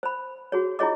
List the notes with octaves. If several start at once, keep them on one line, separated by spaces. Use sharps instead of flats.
C5 B5
F#4 G#4 C#5
E4 F4 G#4 C#5 D#5 D6